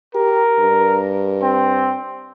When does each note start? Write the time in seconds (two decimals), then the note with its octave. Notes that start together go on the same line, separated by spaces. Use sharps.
0.15 G4 A#4
0.60 G2
1.42 C4